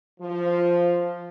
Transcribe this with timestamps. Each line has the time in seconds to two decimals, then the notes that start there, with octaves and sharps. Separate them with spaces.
0.20 F3